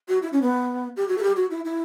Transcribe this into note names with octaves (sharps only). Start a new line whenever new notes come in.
F#4
E4
C#4
B3
G4
F#4
A4
G4
F#4
E4
E4